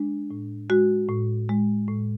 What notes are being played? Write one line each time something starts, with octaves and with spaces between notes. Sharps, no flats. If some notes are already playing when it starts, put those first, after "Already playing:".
Already playing: G#3 D4
A2
G#3 F#4
A2
G#3
A2